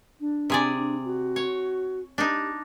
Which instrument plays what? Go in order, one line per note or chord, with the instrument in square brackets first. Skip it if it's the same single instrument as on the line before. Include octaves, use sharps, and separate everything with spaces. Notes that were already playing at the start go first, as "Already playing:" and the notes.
[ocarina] D4
[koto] C3 G#4 D5
[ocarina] D4
F#4
[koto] C#5
[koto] D4 D#4 [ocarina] G4